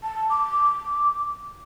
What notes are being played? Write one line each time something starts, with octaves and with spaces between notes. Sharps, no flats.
A5
D6